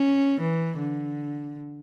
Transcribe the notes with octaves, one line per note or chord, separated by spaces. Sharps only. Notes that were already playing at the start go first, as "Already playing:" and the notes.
Already playing: C#4
E3
D3